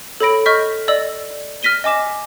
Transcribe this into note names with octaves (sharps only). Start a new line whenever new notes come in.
A4 C#5 B5 A#6 D7
D#5 C#6 F6 G6 B6
D5 D#5 E6 F#7
F6 A#6 B6 D#7 G7
D#5 G#5 D6 E7